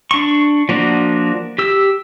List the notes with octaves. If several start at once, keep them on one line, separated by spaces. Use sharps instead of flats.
D4 C#6
F3 A#3 D4 F#4
G4 E6